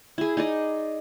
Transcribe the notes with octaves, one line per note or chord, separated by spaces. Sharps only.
E4 G#4
D#4 G#4 D5 D#5